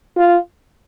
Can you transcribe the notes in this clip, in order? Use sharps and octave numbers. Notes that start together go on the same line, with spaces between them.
F4